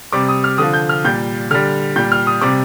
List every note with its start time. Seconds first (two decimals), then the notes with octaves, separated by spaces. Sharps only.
0.12 C3 G3 D6
0.29 D#6
0.44 F6
0.58 D3 F3 D#6
0.74 G6
0.89 F6
1.05 A#2 G3 G6
1.51 D3 G3 F6
1.96 A#2 G3 G6
2.12 F6
2.27 D#6
2.41 C3 G3 D6